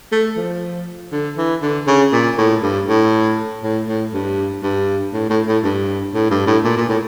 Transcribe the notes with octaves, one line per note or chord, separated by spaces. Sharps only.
A3
F3
D3
E3
D3
C#3
A#2
A2
G2
A2
A2
A2
G2
G2
A2
A2
A2
G2
A2
G2
A2
A#2
A#2
A2